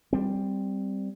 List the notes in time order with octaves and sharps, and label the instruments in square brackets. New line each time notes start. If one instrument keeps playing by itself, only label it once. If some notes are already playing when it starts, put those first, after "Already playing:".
[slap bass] G3 C4